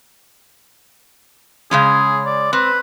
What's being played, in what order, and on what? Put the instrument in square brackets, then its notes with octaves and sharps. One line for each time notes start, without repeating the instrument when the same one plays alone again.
[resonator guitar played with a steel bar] C#3 G#3 C#4 [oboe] G#4
[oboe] D5
[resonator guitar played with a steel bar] C4 [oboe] B4